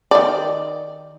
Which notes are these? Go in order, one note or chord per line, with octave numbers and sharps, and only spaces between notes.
D#3 D5